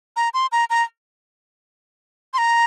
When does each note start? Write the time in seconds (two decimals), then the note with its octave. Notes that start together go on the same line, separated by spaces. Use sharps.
0.16 A#5
0.34 C6
0.52 A#5
0.70 A#5
2.34 C6
2.38 A#5